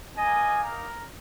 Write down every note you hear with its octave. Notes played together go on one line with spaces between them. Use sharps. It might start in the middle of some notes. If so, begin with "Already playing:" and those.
A#3 D#4 D#5 G#5
A#4